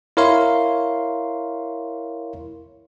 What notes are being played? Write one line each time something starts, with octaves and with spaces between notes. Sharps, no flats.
E4 A#4 C#5 F5 C6